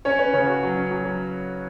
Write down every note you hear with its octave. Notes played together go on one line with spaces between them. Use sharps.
C#4 C#5
C#4 B4
C#3 C#5
F#4
F#3
C#4
F#3
F#3